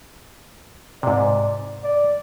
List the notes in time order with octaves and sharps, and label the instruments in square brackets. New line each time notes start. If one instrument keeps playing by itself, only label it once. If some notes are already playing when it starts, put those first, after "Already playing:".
[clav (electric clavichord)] G#2 C3 [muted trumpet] D5
[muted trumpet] D5